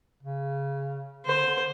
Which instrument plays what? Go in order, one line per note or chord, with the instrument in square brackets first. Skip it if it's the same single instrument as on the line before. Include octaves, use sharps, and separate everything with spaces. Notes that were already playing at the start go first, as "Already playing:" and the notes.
[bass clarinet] C#3
[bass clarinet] D3 [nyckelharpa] C5